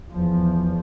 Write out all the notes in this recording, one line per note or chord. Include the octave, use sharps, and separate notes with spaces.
E2 F3